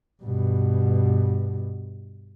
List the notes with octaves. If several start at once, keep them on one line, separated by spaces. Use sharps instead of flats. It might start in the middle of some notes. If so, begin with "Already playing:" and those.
G2 B2